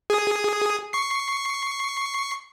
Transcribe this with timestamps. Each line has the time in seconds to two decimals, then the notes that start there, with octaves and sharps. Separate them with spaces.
0.10 G#4 D#6
0.93 C#6 C7